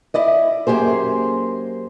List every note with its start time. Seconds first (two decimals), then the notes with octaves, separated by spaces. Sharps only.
0.14 E4 D5 D#5
0.67 F#2 A#3 G4 G#4 C5